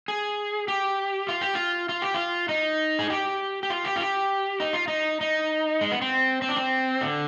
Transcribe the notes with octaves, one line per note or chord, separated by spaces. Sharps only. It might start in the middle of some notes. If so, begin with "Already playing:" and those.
G#4
G4
F4
G4
F4
F4
G4
F4
D#4
G#4
G4
G4
F4
G4
F4
G4
D#4
F4
D#4
D#4
G#3
B3
C4
C4
D4
C4
D3